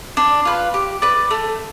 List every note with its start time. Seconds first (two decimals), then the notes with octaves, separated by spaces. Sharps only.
0.17 D4
0.45 F4 B4
0.74 G4
1.02 B4 D5
1.31 A3